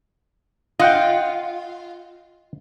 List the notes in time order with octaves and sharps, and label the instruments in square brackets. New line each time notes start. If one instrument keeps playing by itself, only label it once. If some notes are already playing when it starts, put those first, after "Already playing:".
[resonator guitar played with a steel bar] F4 [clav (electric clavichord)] D#5 F#5 G5